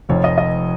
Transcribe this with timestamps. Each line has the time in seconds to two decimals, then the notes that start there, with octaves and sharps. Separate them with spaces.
0.09 F1 F2 F3 C#5
0.24 D#5
0.38 D#5